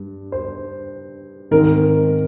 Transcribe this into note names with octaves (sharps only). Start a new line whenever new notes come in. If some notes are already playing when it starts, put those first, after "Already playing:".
Already playing: G2
C5
G#2 D#3 G#3 C4 A#4